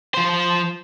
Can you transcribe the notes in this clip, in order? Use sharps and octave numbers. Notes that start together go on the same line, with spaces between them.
F3 C5